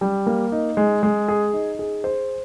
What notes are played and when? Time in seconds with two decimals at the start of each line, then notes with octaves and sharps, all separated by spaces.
0.01 G3
0.26 A#3
0.52 D#4
0.77 G#3
1.03 G#3
1.28 G#4
1.53 D#4
1.79 G#4
2.04 C5